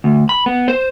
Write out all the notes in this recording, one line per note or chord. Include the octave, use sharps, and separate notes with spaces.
D2
B5
B3
C5